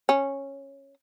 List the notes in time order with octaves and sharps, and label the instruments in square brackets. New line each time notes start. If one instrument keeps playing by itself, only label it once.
[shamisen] C#4